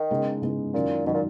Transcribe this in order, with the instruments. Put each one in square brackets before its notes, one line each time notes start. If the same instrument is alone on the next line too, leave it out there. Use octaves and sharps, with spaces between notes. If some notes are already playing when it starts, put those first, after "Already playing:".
Already playing: [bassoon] D#3
[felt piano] C#3 G#3 B3 D#4
C#3 G#3 B3 D#4
[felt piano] F#2 D#3 F#3 [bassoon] A#2
[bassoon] B2 [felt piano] D#3 F#3
[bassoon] A#2